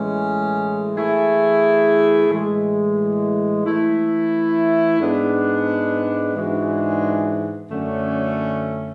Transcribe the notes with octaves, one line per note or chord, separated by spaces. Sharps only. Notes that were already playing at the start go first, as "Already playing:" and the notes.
Already playing: A2 E3 G#3 C#4
E3 A3 E4 G#4
A2 E3 G#3
E3 A3 E4
G#2 G#3 B3 D4
G#2 E3 G#3 D4 F#4
F#2 D3 A3 C#4